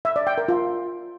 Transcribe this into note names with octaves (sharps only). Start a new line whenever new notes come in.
E5
D5
G5
A#4
F4